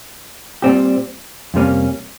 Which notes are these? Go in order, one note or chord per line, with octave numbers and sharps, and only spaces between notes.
A#2 G3 C4 G4
F2 C3 G3 A#3 C#4